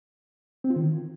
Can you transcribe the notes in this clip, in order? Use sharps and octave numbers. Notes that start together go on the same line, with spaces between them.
C4
F4
D#3